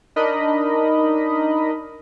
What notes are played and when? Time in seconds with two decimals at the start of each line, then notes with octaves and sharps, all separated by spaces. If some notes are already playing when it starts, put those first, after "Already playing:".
0.16 D4 D#4 A#4 D#5 B5